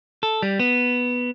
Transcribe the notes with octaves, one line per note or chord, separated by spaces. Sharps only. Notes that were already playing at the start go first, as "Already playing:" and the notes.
A4
G3
B3